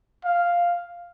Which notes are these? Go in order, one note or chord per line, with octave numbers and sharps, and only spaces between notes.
F5